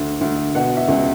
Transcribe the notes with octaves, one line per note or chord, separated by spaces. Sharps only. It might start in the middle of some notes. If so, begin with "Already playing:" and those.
Already playing: D2
D2
B2 F#5
E5
C#2